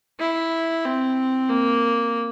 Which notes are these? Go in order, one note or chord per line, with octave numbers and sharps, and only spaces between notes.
E4
C4
A#3